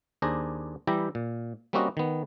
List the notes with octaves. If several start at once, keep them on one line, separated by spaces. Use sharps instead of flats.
D#2 D4 G#4 C5 A#5
E3 G3 E4 G4 G5 A#5
A#2
G3 A#3 C4 C#4 F#4 D#5
D#3 B3